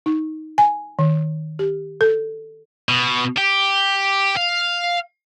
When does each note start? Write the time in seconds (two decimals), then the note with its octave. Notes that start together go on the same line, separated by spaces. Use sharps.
0.06 D#4
0.58 G#5
0.99 D#3
1.59 G4
2.01 A4
2.89 B2
3.38 G4
4.37 F5